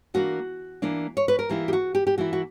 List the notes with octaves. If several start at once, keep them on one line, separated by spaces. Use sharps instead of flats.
E3 A#3 D4 F#4
E3 A#3 D4
C#5
B4
A#4
E3 A#3 E4 G4
G4
F#4
G4
G4
E3 A#3 E4 F#4
F#4